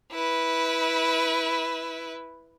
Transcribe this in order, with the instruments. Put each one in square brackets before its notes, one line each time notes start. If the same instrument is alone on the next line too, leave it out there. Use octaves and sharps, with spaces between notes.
[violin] E4 B4